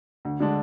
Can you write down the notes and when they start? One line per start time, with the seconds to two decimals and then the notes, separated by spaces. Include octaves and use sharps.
0.25 D2
0.40 D3 G#3 D4